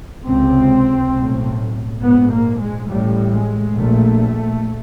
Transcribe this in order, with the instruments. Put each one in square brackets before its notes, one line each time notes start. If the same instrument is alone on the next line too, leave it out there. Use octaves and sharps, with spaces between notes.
[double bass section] C#2 C3 C4
B1 A2
A#1 G#2 B3
A#3
G#3
A1 A2 G3
G#3
A#1 A#2 A3